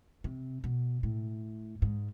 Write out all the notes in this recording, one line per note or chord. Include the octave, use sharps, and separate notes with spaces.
C3
B2
A2
G#2